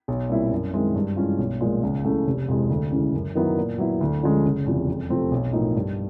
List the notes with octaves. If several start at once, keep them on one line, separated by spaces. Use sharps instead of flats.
B1
A#2 G3 C4 E4
F#2
D#3 G#3 C4 E4
G2
E3 G#3 C#4 F4
B1
A#2 F3 G#3
C#2
C#3 E3 A3
F1
F2 C3 E3 G#3
D2
C#3 E3 G#3 C#4
F#2
D#3 F#3 B3 E4
A#2
F#3 B3 E4
D2
D3 F3 G#3 C#4
F#1
E2 C3 F3
F2
C3 F3 A3 C4
B1
A2 F3 A#3 D#4
G2